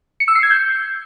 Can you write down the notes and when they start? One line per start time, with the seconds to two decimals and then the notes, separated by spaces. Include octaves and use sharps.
0.20 C#7
0.28 E6
0.35 C7
0.43 G#6
0.51 G6